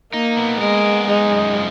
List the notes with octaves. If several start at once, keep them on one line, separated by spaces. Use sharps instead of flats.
A#3 D#4
B3
G#3 A#4
B3
G#3 D#4
F#2
F3